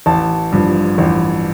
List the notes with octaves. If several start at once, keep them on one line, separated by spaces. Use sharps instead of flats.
A1 A5
G2 F3
A1